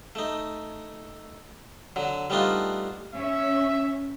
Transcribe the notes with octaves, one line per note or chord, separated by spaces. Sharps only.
A3 D#4
D3 F#3
G3 A3 B3 D4 D#4 F4
C#4 E5